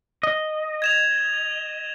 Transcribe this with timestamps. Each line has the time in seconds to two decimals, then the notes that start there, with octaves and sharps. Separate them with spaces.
0.23 D#5
0.82 G#6 E7 F7